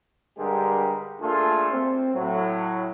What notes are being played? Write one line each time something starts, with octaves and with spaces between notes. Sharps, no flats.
G2 D3 G3 G#3 G4 A#4
A#2 A3 D4 F4 G#4 A4
C4
A2 F#3